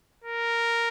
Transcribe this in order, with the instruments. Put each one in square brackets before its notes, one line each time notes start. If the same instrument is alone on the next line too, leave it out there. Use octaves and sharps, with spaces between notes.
[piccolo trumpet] A#4